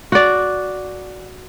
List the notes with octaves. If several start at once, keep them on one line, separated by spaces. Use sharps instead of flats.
F#4 D5